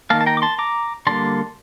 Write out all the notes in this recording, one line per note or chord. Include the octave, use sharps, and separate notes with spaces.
D#3 A#3 F5 A5
A5
G5 A#5
D6
A5 C6
A#5 D6
D3 G3 A#3 A5 C6